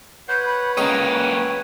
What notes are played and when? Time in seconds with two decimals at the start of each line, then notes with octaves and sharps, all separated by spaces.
0.29 B4 C#5 F#5 G6
0.46 B5
0.77 C#2 A#3 C#4 D#5 G5 A#5